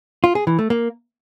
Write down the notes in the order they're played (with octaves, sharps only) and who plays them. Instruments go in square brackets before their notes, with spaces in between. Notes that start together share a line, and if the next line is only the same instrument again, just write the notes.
[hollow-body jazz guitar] F4
G#4
E3
A3
A#3